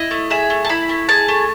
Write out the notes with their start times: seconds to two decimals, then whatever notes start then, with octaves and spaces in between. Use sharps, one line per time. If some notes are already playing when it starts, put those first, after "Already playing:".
Already playing: E4 D#5
0.11 A3
0.30 G#4 E5
0.50 A3
0.65 A5
0.69 E4 B5
0.89 A3
1.09 G#4 A5
1.28 A3